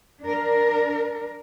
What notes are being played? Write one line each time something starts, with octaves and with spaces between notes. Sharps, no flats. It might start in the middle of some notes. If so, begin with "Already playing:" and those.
D4 A#4